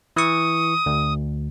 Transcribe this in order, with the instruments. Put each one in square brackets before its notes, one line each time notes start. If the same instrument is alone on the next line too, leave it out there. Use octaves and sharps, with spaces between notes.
[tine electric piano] E3 C#6 [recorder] D#6
[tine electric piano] D2